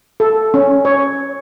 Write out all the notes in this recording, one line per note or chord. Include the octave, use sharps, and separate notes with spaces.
A4
C#4
C#5